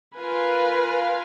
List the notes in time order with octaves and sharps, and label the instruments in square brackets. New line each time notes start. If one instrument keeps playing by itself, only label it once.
[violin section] F4 A#4 F5 G#5 [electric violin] B4